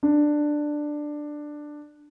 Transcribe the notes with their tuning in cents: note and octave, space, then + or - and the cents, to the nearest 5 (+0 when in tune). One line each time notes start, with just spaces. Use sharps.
D4 +10